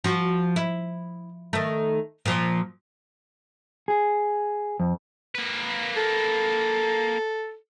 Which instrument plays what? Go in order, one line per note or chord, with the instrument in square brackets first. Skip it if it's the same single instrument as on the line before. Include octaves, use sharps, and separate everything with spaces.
[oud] F3 F#4
E4
D#3 A3
A#2 F3
[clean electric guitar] G#4
F2
[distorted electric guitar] A#3 B4
[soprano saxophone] A4